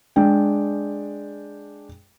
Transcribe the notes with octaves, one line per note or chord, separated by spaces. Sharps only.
G#3 D4 G5